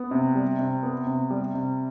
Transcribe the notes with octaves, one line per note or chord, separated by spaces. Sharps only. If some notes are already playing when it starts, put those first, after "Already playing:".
Already playing: B3
C3
G3
C3
B3
C3
G3
C3